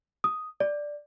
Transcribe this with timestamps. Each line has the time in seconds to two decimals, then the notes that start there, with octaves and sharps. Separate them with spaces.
0.24 D#6
0.60 D5